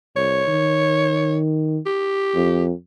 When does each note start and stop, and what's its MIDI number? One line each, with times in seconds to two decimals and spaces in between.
0.16 0.43 36
0.16 1.38 73
0.48 1.79 51
1.86 2.63 67
2.35 2.71 41